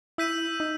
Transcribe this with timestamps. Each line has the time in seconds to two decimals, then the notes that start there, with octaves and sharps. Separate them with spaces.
0.18 E4 E6 G6 B6 D#7
0.60 D#4